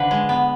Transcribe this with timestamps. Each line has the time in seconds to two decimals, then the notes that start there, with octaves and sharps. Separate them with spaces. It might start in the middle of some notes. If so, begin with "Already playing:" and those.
Already playing: D3 F3 B4
0.11 G#3
0.29 B3